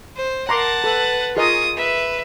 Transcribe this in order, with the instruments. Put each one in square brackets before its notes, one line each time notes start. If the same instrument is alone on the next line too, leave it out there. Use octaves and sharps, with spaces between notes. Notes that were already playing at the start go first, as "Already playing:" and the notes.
[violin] C5
[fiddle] A#4 [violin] F#5 A5 [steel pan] A#5 C6 D6
[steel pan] A4 [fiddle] B4
[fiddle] F4 [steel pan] G#4 A#4 D#5 [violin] C#6 D#6
[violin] B4 [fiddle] E5